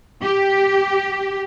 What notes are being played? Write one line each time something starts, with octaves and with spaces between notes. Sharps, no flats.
G4